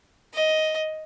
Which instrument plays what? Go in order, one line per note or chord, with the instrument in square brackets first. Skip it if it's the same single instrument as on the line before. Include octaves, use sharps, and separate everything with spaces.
[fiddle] D#5